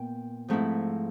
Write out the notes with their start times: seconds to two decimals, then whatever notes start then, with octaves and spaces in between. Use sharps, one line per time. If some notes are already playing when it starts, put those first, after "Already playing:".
Already playing: A#2 B3 G5
0.48 G#2 F3 A3 C4 E4